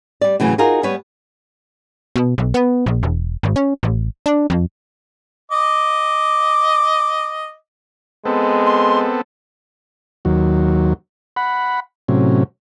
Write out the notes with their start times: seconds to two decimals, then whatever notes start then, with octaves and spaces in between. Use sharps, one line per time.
0.21 G3 D5
0.40 A2 C#3 E3 F#3
0.58 D#4 F4 F#4 G#4 A#4
0.83 G3 B3 B4 C#5
2.16 B2
2.38 B1
2.54 B3
2.86 A#1
3.03 E1
3.43 G#1
3.56 C#4
3.83 A1
4.26 D4
4.50 F2
5.52 D#5 D6
8.25 G#3 B3 C4 A4
8.66 C6
10.25 D#2 F#3
11.36 F#5 B5
12.08 A2 C3 F#3 C#4